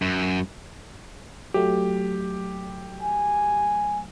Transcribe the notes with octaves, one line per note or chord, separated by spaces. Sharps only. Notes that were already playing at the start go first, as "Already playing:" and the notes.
F#2
F#3 A3 G4
G#5